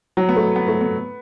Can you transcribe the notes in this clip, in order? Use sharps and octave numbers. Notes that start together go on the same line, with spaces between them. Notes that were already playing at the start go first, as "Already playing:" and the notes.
F#3
B3
A3
B3
A3
B3